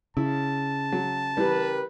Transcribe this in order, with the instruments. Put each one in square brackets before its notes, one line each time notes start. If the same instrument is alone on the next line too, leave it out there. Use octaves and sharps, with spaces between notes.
[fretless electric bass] C#3 [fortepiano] E4 [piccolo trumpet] A5
[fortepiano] F#3
[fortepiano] E3 G3 [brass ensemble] G4 A#4 B4